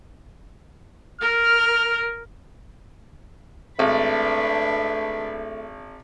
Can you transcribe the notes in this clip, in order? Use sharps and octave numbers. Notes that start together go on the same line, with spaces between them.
A#4 F6
G#1 A3 D4 B4